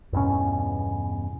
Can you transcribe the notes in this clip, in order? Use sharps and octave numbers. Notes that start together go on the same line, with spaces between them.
E2 G2 B2 C#4